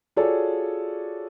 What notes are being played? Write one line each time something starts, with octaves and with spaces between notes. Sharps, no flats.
F4 F#4 G#4 A4 C#5 D5